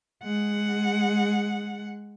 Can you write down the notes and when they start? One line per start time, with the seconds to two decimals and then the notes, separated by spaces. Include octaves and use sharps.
0.23 G#3 F#5